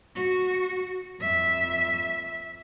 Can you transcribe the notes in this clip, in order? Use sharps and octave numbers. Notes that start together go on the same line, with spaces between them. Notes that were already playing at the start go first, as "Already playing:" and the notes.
F#4
F2 E5